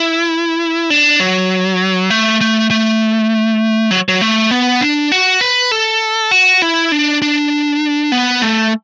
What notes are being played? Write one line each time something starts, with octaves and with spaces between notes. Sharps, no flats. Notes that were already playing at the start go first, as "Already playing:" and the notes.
Already playing: E4
D4
F#3
A3
A3
A3
F#3
F#3
A3
B3
D4
F#4
B4
A4
F#4
E4
D4
D4
B3
A3